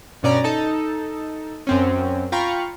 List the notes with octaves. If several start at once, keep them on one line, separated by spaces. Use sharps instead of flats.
G2 B2 C#4 D5 A#5
D#4 A4 A5
F#2 C4 C#4
F4 F5 G5 A#5 B5 C#6